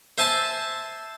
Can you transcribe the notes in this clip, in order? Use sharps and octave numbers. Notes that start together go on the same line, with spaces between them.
C5 E5 G#5 A5 C6